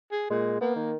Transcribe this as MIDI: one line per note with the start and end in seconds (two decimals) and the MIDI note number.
0.12 0.25 68
0.30 0.57 46
0.30 0.58 56
0.61 0.92 58
0.61 0.75 59
0.75 0.96 51